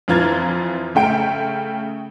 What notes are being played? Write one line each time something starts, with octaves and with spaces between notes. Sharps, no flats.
F2 E3 F4 A#5 G#6 A6
C#3 A3 G5 D7